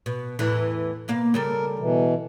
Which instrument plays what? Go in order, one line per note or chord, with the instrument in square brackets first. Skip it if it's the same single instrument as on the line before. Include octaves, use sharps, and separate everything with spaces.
[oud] B2
E2 A2 E3
B2 A#3 F5
[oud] C#3 G3 A4 [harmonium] A#4
[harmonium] B2 E3